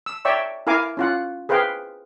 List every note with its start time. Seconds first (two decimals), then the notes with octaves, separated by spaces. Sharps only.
0.06 E6
0.25 C#5 D5 E5 G5 C#6 E6
0.67 E4 A#4 F5 G#5 D6
0.97 C#4 F4 F#5
1.49 G#4 B4 C5 F5 G5